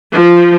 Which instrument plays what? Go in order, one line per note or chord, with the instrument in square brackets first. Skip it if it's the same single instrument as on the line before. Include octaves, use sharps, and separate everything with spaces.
[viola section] F3